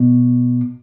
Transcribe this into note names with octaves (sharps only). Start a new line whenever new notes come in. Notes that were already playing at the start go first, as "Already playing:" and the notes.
Already playing: B2